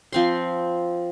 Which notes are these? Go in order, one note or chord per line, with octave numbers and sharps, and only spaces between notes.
F3 C4 C6